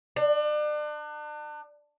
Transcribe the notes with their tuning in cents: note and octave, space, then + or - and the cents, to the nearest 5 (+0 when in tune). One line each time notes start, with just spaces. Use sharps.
D4 +35